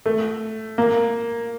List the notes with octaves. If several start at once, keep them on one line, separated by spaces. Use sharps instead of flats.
A3
A#3